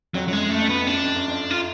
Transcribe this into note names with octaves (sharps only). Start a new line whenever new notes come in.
F2 F#3
F#2 F#3
F2 G#3
F#2 A3
F2
F#2 B3
F2
D4
F#2
F2
F#2
F2
F4